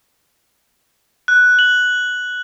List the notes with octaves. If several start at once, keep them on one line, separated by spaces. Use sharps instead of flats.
F#6
F#7